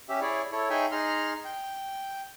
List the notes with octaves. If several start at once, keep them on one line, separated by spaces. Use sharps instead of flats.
C#4 G4 E5
E4 G#4 C#5 D5
E4 A4 C#5
D#4 G#4 C#5 E5 G5 G#5
D#4 G#4 A#5 C6 F6
G5